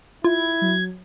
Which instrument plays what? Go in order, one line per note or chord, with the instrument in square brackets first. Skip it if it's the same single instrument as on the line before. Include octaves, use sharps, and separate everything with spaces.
[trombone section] E4 [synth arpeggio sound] F4 [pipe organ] G#6
[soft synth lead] F#3